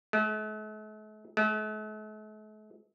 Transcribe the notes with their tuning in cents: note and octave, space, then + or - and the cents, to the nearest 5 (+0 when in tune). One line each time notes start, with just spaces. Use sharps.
A3 -45
A3 -45